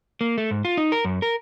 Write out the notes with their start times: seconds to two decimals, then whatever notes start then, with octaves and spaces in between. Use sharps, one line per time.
0.21 A#3
0.38 A3
0.51 G#2
0.65 F4
0.77 D#4
0.92 A#4
1.05 F#2
1.22 A#4